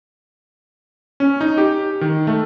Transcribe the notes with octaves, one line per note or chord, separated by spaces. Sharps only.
C#4
D#4
G4
D#3
A3